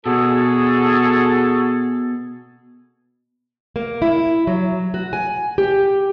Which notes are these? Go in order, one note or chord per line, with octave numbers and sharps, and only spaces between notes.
B2 F#4 G#4 A4
A#3
E4
F#3
F#4
G#5
G4